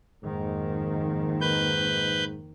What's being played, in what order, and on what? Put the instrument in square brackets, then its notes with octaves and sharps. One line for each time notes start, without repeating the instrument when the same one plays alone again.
[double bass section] F2 D#3 A#3 [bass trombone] G#2
[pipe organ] B4 G6